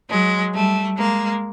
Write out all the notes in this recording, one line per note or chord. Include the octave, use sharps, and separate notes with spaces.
F#3 G#3
G3 A3
G#3 A#3